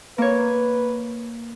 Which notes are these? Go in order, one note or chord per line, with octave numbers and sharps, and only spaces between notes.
A#3 B4 C#5